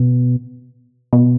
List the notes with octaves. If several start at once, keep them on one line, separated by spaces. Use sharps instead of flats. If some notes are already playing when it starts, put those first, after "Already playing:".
Already playing: B2
B2